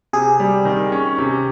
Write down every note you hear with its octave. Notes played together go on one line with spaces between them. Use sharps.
C3 G#4
G3
D#3
C#4
C3